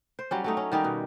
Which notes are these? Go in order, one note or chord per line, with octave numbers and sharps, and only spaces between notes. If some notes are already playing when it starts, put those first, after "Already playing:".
C5
F#3 G3 C#4
F#3 A3 D#4
C#4
D#3 G3 D#4 G4
B2